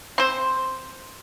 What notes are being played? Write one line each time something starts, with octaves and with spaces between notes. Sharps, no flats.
C4 C5